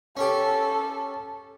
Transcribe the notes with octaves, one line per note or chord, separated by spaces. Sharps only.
C#4 G4 A4